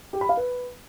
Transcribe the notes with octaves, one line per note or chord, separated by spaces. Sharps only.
G4
B5
F5
B4